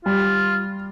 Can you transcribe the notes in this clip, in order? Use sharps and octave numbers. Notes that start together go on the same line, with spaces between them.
G3 F4